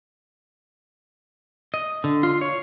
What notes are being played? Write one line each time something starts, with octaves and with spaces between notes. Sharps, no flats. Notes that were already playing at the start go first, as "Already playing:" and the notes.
D#5
D3
F4
C#5